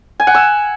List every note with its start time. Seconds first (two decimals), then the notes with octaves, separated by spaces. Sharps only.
0.20 G#5
0.27 F#5
0.35 E6